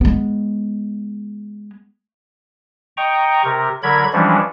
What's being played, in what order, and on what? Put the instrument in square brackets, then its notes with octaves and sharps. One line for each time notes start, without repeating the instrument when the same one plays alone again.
[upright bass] G#3 B3
[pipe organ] D#5 G5 A#5 C#6
C3 A#4
D3 F#3 A#4 B5 G#6
E3 F3 G3 G#3 C#4 D4